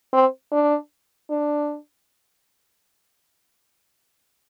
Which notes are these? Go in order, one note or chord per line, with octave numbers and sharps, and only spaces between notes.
C4
D4
D4